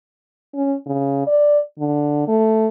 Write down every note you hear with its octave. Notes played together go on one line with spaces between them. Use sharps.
C#4
C#3
D5
D3
A3